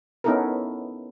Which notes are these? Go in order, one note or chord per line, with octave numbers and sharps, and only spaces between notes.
B3 C#4 D#4 E4 A4 A#4